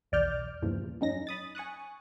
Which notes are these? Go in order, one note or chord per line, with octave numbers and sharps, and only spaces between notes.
B1 E2 D5 D6 F6 G6
E2 G2 A#2 C#3 E3 F3
F#2 C#4 D#4 A#6
B5 D#6 A6
G#5 C#6 D#6 F#6